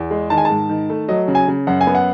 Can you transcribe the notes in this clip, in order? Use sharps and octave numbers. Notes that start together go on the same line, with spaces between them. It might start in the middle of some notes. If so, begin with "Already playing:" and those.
Already playing: E2
G#3
D#3 A5
G#5
A5
G#2
D#3
A3
F#3 D#5
C#3
G#5
C#3
F#2 F#5
G#5
B3
F#5